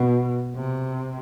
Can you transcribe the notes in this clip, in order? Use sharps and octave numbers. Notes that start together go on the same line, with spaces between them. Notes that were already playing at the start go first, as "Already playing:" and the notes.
Already playing: B2
C3